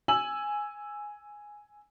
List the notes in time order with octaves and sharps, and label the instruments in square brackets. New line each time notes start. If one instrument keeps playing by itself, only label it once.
[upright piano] G#5 E6 F#7